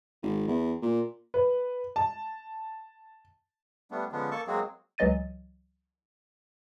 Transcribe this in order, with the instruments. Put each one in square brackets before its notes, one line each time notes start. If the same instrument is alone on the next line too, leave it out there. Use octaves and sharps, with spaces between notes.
[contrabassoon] G#1
E2
A#2
[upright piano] B4
A5
[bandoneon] G3 A3 B3 D4
D3 F3 G#3 B3 C#4 D4
A#3 A4 A5 C#6
F#3 G#3 A#3 C4 F#4 G#4
[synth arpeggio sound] C#2 E3 F#3 D#5 A6 D#7